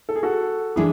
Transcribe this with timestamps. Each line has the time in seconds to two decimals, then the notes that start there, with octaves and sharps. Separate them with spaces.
0.09 A4
0.16 G#4
0.23 F#4 A4
0.76 E3 G#3 D4 E4 G#4